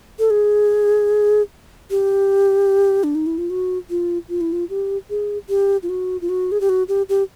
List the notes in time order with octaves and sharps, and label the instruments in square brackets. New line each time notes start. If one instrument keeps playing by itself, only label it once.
[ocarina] A4
G#4
G4
D4
D#4
E4
F4
F#4
F4
F4
E4
F4
G4
G#4
G4
F4
F#4
F4
F#4
G#4
G4
F#4
G4
G4